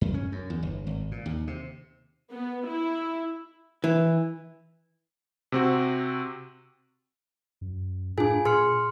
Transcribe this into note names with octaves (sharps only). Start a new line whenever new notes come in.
F#2
C#4
F#2
E2
G1
G#1
A#2
D#2
C3
B3
E4
E3
C3 C4 F#4
F#2
A2 D4 F4 G#4 G#5
A#2 G#4 C6 F6 C#7